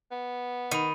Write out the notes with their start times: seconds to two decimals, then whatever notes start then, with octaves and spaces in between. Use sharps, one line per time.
0.11 B3
0.71 D#3 B5 D#7